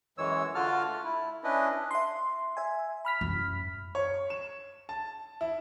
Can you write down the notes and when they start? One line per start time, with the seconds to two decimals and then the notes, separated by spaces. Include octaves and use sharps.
0.18 F#2 E3 G#3 C#5 E6
0.55 D3 F4 F#4 A5 F6
0.88 A3
1.04 E4
1.44 C#4 D4 E4 B4 D#5
1.91 E5 C6
2.57 E5 G#5
3.05 B5 F6 B6
3.21 F#2
3.95 C#5
4.30 E7
4.89 A5
5.41 E4